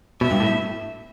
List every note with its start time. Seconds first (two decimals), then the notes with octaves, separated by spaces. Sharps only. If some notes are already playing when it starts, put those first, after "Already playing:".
0.21 B2 E5
0.31 G2
0.40 A2